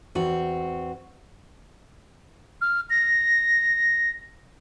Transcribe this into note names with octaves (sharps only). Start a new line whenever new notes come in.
E2 C4 F#4
F6
A#6